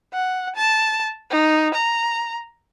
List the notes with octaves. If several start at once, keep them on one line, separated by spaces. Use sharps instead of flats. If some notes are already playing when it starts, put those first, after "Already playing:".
F#5
A5
D#4
A#5